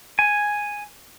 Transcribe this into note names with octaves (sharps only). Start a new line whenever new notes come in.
G#5